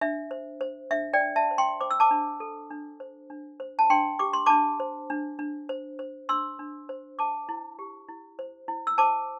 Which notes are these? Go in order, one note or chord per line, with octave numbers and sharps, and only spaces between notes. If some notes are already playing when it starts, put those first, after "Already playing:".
D4 E5
C5
C5
D4 E5
D5 G5
D4
E5 A5
C5
G5 C6
C5 D6
E6
A5 D6
D4
A4
D4
C5
D4
C5
A5
D4 G5 C6
G4 D6
C6
D4 A5 D6
C5
D4
D4
C5
C5
D4 C6 E6
D4
C5
C5 A5 D6
E4
G4
E4
C5
E4
E6
C5 A5 D6